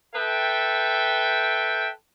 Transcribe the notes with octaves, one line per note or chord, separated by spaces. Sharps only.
A4 B4 E5 G5